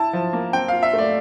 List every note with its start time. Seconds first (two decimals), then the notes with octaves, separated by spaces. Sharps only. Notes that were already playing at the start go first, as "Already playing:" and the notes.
Already playing: E4 A5
0.13 F3
0.33 A#3
0.53 C4 G5
0.68 F4 F5
0.83 E5
0.93 A3 D5